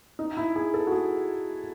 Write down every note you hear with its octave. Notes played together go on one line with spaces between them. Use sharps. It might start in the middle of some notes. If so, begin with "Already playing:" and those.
D#4
E4
G#4
A4
F#4
G#4